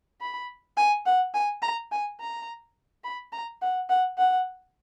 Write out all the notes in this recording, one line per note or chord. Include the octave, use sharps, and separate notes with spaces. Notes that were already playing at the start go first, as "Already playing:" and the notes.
B5
G#5
F#5
G#5
A#5
G#5
A#5
B5
A#5
F#5
F#5
F#5